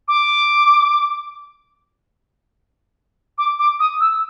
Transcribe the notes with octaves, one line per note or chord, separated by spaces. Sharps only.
D6
D6
D6
D#6
E6